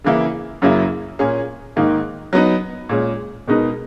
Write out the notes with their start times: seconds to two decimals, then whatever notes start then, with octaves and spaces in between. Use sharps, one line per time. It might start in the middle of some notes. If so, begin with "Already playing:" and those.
0.04 C#3 E3 A#3 E4
0.62 F#2 C#3 F#3 A#3 E4
1.19 A#2 A#3 C#4 G#4
1.76 G#2 D#3 A#3 D#4
2.33 F#3 B3 D#4
2.89 A#2 G#3 C#4
3.48 B2 G#3 B3 D#4 A#4